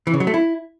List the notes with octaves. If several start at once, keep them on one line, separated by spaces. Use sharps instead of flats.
E3
C#3
F#3
A3
E4